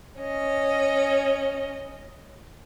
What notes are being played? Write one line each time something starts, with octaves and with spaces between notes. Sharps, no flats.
C#4 D#5